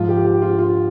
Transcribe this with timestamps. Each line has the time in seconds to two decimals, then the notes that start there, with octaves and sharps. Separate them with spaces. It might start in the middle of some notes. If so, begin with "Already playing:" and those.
Already playing: G#2 F3 F4
0.09 G4
0.25 G4
0.42 F4
0.59 F4